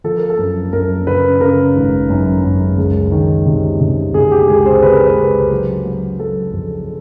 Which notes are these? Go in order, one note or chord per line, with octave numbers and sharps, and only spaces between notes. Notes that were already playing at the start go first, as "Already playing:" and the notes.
F3 A4
A#4
A4
F#2
F#2 A#4
C#3 B4
C#3 A#4
G#1
F#2
F#2
C#2
D#3
C3
C3
C3 G#4
G4
C#2 G#4
C5
C3 B4
A#4
B4
C#2
F#3
F#3
F#3 A4
F2